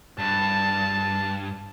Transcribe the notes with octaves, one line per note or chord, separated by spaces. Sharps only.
G2 A5